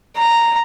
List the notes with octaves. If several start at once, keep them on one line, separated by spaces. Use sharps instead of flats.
A#5